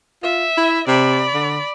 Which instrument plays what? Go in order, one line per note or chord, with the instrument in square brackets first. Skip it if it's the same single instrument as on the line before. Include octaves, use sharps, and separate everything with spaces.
[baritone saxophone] F4 [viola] E5
[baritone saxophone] E4
[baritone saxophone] C3 [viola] D5 B5
[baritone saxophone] D3